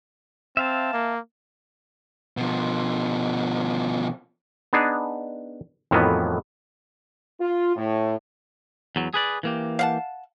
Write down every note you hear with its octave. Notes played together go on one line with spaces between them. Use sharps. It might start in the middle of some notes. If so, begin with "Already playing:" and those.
C4 E5 F5 A5
A#3
B2 F3
B3 D4 D#4 G#4
F2 A2 D#3 E3 F#3 B3
F4
A2
E2 F#3
G#4 B4 D5
E3 A#3 G4
F5 F#5 A5